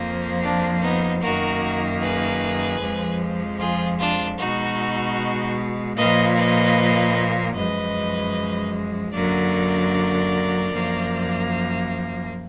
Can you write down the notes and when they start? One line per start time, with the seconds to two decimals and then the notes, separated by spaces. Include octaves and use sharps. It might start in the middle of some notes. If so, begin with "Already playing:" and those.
Already playing: F2 F3 A#3
0.43 D4
0.82 B3 D#4
1.22 F#2 D#3 A#3 F#4 A#4
2.01 G#4 B4
2.80 F2 F3 G#3
3.59 F4 G#4
3.99 D4 F4
4.38 B2 G#3 D#4 F#4
5.96 A#2 F3 A#3 B4 D#5
6.37 B4 D#5
7.55 F#2 F3 G#3 B4 D#5
9.13 F#2 D3 F#3 A#3 A#4 D5
10.72 F#2 F3 A#3